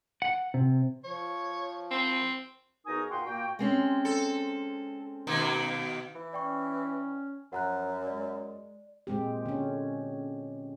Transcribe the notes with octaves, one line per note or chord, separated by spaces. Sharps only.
F#5
C3
F3 C#5
C4
E2 D#4 F#4 A#4 G#5 D#6
A#2 F#5 G5 C6
A#2 A#3 F#4 G5
G#3 C4 C#4
A4
B2 D#3 A#3
E3
C#4 D5 G5 C#6
F#2 F3 F#5 A#5 F#6
G#3 D5
A#2 G#3 C4 G4
D3 C#4